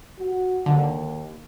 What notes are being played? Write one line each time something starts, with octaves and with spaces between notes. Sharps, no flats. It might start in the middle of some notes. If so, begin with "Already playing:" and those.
F#4
D#2 D3